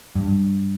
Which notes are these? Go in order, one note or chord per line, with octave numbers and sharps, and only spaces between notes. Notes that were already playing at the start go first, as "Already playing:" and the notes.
G2